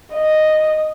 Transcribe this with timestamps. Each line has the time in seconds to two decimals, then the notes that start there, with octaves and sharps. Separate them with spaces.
0.13 D#5